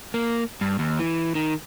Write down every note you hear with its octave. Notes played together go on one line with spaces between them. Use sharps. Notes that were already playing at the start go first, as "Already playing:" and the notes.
A#3
G2
D#2
E3
D#3